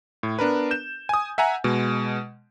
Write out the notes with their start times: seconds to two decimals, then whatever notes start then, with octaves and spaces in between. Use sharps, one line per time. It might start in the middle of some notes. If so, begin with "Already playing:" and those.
0.23 A2
0.39 B3 D4 A#4 B4
0.71 G6 E7
1.09 G#5 D#6
1.38 E5 F#5 G#5 A#5
1.64 B2 G#3